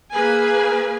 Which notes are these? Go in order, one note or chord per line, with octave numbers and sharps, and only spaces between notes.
A#3 G#4 B4 G#5